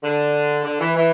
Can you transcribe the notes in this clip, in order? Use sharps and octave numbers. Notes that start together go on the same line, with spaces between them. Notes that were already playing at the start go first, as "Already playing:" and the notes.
D3
D3
E3
E3